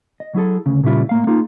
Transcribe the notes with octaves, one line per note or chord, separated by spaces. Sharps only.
D#5
F#3 E4 G#4 A4
D2 C#3
A#2 C#3 G3 E4 F4
A2 A#3 F5
A#3 D#4 F4 G#4